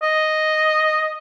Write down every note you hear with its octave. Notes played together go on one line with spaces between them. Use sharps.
D#5